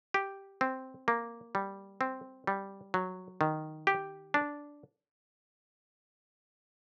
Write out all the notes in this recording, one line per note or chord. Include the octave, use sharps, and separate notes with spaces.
G4
C4
A#3
G3
C4
G3
F#3
D#3
G4
D4